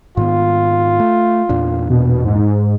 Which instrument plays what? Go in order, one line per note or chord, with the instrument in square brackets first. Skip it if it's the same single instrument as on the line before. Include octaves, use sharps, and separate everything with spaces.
[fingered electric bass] G#2 D#3 B3 [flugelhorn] F4
[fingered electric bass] A3
E2 A#2 D4
[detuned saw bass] B2
G#2